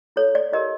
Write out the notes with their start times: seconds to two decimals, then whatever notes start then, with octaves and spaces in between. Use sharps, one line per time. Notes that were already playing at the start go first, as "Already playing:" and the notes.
0.16 E4 A4 C#5
0.35 D5
0.52 E4 G4 A#4 C#5 D#5